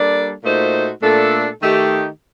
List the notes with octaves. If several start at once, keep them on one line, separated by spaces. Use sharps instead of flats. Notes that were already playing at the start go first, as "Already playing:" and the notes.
Already playing: G3 A#3 D4 A4 D5
A#2 A3 D#4 F#4 C5
A#2 A3 D4 A4
D#3 A3 D#4 G4